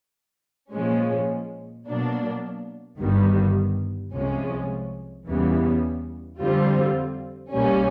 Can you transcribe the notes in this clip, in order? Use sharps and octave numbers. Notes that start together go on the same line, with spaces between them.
A#2 F3 G#3 C#4
B2 F#3 A#3 D4
G1 G2 D#3 G3 B3
C2 C3 F3 G#3 C#4
E2 C#3 E3 G3 B3
F2 D3 G3 C4 F4
B1 B2 G3 A#3 C#4